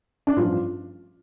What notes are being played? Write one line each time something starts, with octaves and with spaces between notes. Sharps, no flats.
D4
A1 G2 F3 F4